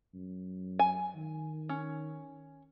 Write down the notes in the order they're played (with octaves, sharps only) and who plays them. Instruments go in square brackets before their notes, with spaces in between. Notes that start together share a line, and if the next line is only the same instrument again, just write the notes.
[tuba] F#2
[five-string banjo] G#5
[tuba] D#3
[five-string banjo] C#4